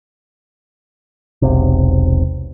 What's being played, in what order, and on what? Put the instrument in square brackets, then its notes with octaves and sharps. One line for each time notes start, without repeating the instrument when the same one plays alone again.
[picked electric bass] E1 B1 C3